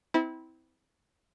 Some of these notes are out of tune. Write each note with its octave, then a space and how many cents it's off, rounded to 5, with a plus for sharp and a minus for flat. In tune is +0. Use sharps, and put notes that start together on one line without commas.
C4 -25 E4 -25